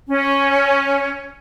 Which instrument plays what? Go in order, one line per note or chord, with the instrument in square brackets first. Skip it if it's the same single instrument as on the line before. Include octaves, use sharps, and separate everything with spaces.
[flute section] C#4